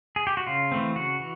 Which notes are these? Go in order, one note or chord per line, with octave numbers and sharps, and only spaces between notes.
G#4
G4
F#4
C#3 F4
E3 A3 C4
C#3 F#4
E3